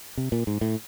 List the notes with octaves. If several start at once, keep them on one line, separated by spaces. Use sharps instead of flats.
C3
A#2
G#2
A2